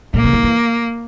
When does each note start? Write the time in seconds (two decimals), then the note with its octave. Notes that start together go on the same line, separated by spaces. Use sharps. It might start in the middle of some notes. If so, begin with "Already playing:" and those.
0.14 A#2 A#3
0.24 C#3
0.33 D#3
0.43 E3